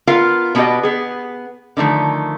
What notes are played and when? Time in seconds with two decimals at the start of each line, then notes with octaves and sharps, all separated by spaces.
0.07 B3 F4 A#4 F5
0.55 B2 B3 E4 F#4 G4 D#5
0.83 B3 G#4
1.77 D3 D#3 F3 A3